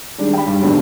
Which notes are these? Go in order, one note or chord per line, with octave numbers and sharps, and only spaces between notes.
D#3 G3 G#3 D4
G5 B5
G2 G3
G1 D#2 G#2 B2 D3 F#3